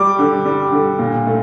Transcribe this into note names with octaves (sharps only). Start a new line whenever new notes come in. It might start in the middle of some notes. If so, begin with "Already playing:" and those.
Already playing: G3 D6
D3
G3
D3
A#2
A3